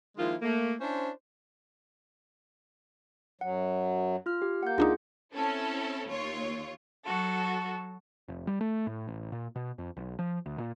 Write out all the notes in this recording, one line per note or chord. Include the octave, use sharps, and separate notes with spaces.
D#3 F3 G#3 A#3 E4 F4
A3 A#3
C#4 D4 E4 C5
F#2 F#3 F#5
F4 F6
G4
A#3 F#5 G6
C#2 D4 D#4 F4 G#4
C4 C#4 E4 A4
D#2 F4 C#5
F#3 F#4 A4
F1
G3
A3
A2
A1
A#2
B2
F2
B1
F3
D2
A#2